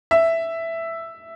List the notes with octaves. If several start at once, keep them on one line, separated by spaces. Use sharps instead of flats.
E5